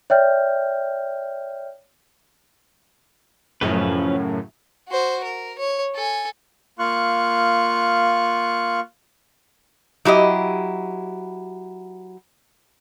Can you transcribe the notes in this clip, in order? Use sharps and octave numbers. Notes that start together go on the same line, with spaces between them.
C#5 D5 E5 G5 F6 G6
F#2 A2 C#3 F3 C#4 B4
F#4 C5
A#4
C#5
A4 G#5
A#3 F4 F5 C#6 F#6
F#3 E4 G4 D#5